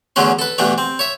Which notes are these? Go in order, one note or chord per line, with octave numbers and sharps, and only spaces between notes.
E2 D3 F#3 A3 C#4 C6
A4 B4
G2 B2 E3 A3 B3 D4
C4
C#5 E5